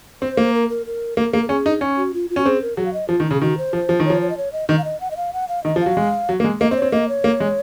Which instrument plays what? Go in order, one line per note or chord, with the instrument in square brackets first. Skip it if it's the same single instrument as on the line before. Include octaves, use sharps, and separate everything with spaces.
[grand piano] C4 [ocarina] C5
[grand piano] A#3
[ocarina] A#4
A#4
A#4
[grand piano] A#3 [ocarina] A#4
[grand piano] A#3 [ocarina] G#4
[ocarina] A#4
[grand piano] C#4 [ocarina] G#4
[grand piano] D#4
C#4
[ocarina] F#4
F4
F4
[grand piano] C#4 [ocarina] F#4
[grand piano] C4 [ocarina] G#4
[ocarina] A#4
[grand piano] F#3 [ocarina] G#4
[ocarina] F5
D#5
[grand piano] F3 [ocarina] F4
[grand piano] D#3
[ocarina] D#4
[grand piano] C#3
[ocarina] G#4
[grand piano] D#3 [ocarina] F#4
[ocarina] C5
[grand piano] F3
F3
D#3
[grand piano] F3 [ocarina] C#5
[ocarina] C#5
D#5
C#5
D#5
[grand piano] D#3 [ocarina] D#5
[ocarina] F5
D#5
F#5
D#5
F5
F#5
F5
[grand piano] D#3 [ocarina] D#5
[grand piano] F3
[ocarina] F5
[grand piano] F#3
G#3
F#3
A#3
G#3
[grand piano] A#3 [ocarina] D#5
[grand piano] C4 [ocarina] D#5
[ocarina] C#5
[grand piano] C4
[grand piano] A#3 [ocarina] D#5
[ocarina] C#5
[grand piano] A#3
G#3